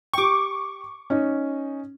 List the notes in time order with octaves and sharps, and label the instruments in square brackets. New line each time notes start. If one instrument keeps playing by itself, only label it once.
[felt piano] G4 G5 [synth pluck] C#6 D6
[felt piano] C#4 D#4